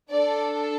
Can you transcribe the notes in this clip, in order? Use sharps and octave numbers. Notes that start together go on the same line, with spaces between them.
D4 A4 D5